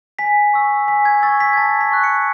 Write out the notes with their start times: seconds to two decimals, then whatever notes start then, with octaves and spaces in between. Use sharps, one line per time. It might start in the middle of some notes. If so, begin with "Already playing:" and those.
0.19 G#5 B6
0.54 C#6 E6
0.88 G#5 B6
1.05 G#6
1.23 C#6 E6 A6
1.40 B6
1.53 G#6
1.57 A5 A6
1.81 B6
1.92 C#6 F#6
2.04 C#7